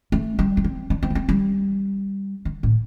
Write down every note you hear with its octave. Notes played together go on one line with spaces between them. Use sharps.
A3
G3
D4
C4
D4
C4
A3
C4
G3
D3
A2